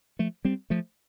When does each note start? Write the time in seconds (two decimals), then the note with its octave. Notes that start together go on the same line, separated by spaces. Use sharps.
0.19 F3 A3
0.45 G3 C4
0.70 F3 A3